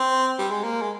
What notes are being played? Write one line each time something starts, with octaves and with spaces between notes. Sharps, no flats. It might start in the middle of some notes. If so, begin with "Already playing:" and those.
Already playing: C4
G3
G#3
A#3
G#3